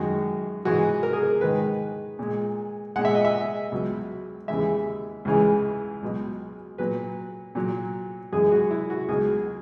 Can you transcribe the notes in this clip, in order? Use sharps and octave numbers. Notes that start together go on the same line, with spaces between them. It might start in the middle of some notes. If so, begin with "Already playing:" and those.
Already playing: F#2 D#3 G#3 F#4
G#2 E3 G#3 F#4
A#4
G#4
A#4
G#2 D#3 G#3 B4
A#2 G#3
A#2 G#3 F#5
E5
D#5
E5
C#2 B2 F#3
D#2 C#3 E3 G#3 E5
C#2 C#3 E3 G#3
C#2 B2 F#3
A#2 F#3 B4
A#2 F#3
F#2 E3 G#3 G#4
F#4
E4
F#4
C#2 B2 F#3 G#4